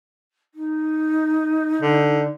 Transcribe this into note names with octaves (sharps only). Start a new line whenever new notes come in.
D#4
D3